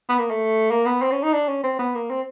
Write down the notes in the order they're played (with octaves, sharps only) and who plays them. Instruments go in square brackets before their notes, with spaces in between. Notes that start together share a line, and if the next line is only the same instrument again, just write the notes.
[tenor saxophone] B3
A#3
A3
A#3
B3
C4
C#4
D#4
D4
C#4
C4
B3
A#3
C4